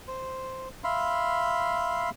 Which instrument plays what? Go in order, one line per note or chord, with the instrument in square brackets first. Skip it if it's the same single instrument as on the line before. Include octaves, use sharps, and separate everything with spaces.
[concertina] C5
E5 F5 B5 C6